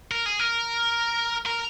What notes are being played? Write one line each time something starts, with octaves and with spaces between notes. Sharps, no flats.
A#4
G#4
A#4
A#4